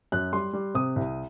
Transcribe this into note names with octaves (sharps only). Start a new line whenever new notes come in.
F#2 F#6
G3 C6
G3
C3 D#6
C2